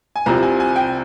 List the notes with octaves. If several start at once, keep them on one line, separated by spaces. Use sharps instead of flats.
G#5
C2 C3 F3 C4 A#5
G#5
G#5
G5